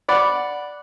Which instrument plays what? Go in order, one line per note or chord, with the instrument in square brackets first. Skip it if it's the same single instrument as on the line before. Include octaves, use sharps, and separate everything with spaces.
[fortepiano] D5 F#5 B5